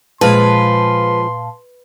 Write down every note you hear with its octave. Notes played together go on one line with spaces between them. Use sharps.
A#2 F3 G#3 G#4 B4 F5 A5 C6